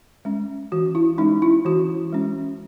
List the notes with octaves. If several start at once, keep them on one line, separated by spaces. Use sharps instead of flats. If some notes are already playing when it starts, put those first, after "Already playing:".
G#3 C#4
E3 F#4
E4
G#3 C#4 D#4
E4
E3 F#4
G#3 C#4